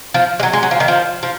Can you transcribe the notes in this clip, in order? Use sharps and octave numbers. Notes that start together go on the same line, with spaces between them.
F3
G#3
F#3
G#3
F#3
F3
D#3
F3
F3